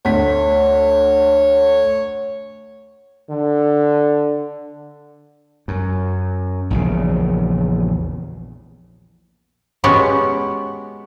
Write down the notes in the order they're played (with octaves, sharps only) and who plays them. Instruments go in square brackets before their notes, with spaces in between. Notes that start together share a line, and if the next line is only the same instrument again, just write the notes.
[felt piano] D2 B6 [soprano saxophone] C#5
[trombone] D3
[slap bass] F#2
A#1 E2 C#3
[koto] G#3 B3 C#4 F#4 G4